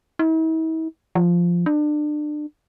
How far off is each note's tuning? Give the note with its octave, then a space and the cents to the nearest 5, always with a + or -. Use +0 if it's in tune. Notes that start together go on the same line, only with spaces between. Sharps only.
E4 -45
F3 -5
D4 +30